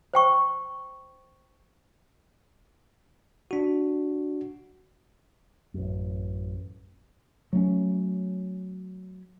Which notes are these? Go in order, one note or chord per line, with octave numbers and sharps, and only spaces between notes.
C5 G5 C#6
D4 F#4
A1 F#2
F#3 A3 C4 C#4